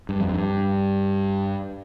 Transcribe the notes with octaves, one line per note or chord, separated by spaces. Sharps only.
G2
F2
G2